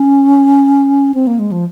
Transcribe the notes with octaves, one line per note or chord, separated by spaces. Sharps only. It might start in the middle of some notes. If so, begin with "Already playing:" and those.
Already playing: C#4
C4
A#3
G#3
F3